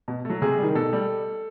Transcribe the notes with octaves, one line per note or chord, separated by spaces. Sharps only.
B2
F#3 A3
C3 G#4
D#3 G3
B2 A4
G3